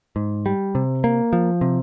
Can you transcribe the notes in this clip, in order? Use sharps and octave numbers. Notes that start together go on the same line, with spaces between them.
G#2
G3
C3
A#3
F3
C3